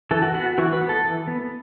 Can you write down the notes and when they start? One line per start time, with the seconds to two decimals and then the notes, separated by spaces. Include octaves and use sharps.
0.11 E3 A4
0.22 F#4
0.34 B3 F#4
0.58 E3 F#4
0.73 B4
0.81 B3
0.89 A4
1.05 E3
1.27 B3